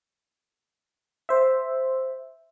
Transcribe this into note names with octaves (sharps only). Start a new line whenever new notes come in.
C5 E5